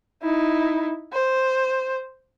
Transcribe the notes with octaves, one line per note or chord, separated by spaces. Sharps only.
D#4 E4
C5